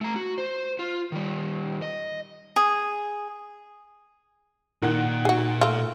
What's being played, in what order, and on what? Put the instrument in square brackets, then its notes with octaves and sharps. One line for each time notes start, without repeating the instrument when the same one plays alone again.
[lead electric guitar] A3 A#5
F#4
C5
F4
D#3 G3
D#5
[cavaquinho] G#4
[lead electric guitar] A#2 [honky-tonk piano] D#3 F#5 F#6
[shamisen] F#4 G#4
A3 F4